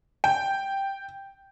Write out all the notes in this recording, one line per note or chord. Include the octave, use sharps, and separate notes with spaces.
G5